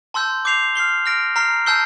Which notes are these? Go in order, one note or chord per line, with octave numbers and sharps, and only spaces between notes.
A5 C6 E6 G6
D6 G6 C7 F7
F6 C7 G7
F6 A#6 D7
A#5 F6 C7
A5 E6 G6 C7 G7